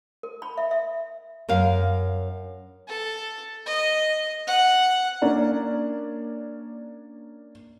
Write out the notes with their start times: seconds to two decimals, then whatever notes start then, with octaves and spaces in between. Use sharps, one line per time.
0.23 A#4
0.42 B5
0.57 E5
0.71 E5
1.49 F#2 A#4 F5
2.88 A4
3.66 D#5
4.47 F#5
5.22 A#3 C#4 D4 A#4